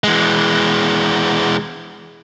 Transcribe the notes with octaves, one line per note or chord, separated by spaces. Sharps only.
E3 G#3